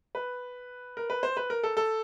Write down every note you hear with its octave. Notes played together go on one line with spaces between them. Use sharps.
B4
A#4
B4
C5
B4
A#4
A4
A4